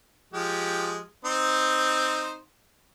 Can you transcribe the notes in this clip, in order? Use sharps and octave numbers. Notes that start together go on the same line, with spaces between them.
F3 G#3 G4
C4 D#4 C5